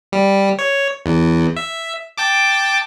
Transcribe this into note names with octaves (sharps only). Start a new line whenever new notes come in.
G3
C#5
E2
E5
G5 A5 D6